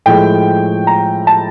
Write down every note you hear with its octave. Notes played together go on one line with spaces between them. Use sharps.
A2 F3 G#3 G5
A#5
A5